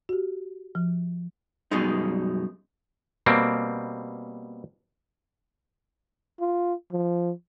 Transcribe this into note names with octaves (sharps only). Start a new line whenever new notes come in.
F#4 G4
F3
F#2 B2 G3 G#3 D#4
B2 G3 A#3 C4
F4
F3